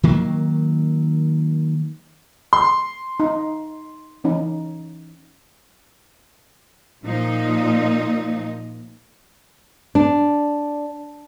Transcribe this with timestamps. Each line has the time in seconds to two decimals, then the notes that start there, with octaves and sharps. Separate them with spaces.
0.03 D#3 F#3 A#3
2.53 C6
3.20 D#4
4.24 E3 C#4 D#4
7.04 A#2 F3 D#4
9.95 D4